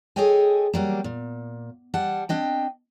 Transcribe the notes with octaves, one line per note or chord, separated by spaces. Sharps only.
G#4 A4 C#5 D#5 G5 G#5
F#3 G3 A#3
A#2
G3 F#5 A5
C4 D4 D#5 G5